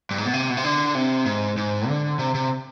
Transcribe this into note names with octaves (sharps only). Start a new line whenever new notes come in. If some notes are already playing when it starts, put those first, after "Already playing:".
G2
G#2
B2
C3
B2
C3
D3
C3
G#2
G#2
D3
C3
C3